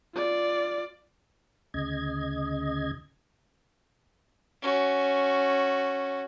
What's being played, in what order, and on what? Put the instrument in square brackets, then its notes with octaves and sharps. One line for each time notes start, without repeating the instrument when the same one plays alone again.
[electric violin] F4 D5
[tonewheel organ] D2 C#3 D#5 G#6
[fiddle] C#4 F#4